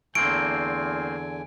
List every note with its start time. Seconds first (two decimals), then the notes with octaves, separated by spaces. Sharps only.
0.15 E2 D3 A3 A#3 C4 G#5 D7